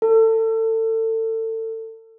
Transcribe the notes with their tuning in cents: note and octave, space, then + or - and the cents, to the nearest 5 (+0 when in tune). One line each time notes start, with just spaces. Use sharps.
A4 +30